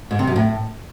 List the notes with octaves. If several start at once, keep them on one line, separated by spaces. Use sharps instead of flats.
G#2
C3
F#2
A2